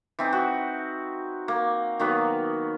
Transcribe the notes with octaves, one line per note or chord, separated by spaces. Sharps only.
E3 C4 D#4
F#4
A#3
D#3 F#3 A#3 B3